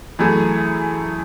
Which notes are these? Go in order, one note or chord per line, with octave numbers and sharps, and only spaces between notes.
F#2 E3 A3 E4 G#4